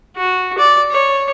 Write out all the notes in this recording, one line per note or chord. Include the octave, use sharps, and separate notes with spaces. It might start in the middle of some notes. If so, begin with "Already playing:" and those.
F#4
D5
C#5